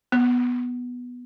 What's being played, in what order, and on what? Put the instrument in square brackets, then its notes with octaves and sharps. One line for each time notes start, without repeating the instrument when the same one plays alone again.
[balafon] B3